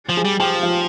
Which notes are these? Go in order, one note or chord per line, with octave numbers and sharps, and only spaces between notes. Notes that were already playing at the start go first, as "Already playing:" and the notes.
F3
G#4 G#5
G3
F3 G4 G5
F4 F5